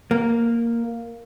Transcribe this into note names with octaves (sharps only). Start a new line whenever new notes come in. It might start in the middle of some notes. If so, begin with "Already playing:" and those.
A#3